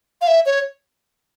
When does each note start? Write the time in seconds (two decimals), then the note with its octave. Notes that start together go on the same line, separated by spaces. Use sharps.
0.21 F5
0.27 E5
0.46 C#5